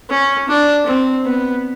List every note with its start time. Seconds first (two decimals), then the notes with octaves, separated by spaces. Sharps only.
0.10 C#4
0.49 D4
0.86 C4
1.25 B3